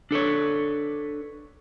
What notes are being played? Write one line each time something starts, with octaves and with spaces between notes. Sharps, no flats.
D4 A4 B4 C#5